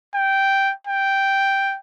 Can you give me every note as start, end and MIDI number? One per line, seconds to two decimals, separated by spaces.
0.15 0.73 79
0.87 1.77 79